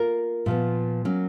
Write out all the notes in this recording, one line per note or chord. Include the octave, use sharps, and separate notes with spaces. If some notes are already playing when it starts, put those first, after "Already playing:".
Already playing: A#3 F4 A#4
A#2 F3 B3
F#3 A#3 C#4